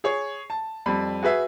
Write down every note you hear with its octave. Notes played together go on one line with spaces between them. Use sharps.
G#4 C#5 C#6
A5
F2 G3 B5
F#4 G#4 B4 E5